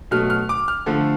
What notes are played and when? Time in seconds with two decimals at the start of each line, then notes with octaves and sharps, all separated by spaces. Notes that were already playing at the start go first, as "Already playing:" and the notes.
0.11 B2 F#3 A3 F6
0.30 F6
0.49 D6
0.68 F6
0.86 D3 F3 A3